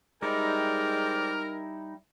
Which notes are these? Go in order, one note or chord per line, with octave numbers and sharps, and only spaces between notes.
G3 G#3 D#4 E4 A#4 C5 D5 G5